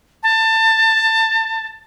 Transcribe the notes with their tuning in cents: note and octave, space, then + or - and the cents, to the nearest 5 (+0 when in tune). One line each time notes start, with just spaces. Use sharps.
A5 +25